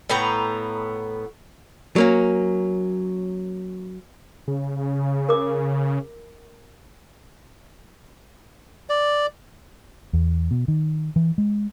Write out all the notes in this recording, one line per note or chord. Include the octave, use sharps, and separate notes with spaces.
A2 B3 G5 A#5
F#3 A#3 C#4
C#3
A#4 D6
D5
E2
B2
D#3
E3
G#3